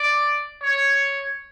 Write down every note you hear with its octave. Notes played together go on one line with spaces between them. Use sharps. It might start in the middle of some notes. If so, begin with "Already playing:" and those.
Already playing: D5
C#5